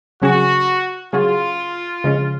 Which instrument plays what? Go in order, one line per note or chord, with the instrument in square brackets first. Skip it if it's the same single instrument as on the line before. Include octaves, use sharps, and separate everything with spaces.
[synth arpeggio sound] C#3 F#3 C#4 G#4 [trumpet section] F#4
[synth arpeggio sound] C#3 F#3 C#4 G#4 [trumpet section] F4
[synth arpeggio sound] C#3 F3 G#3 C#4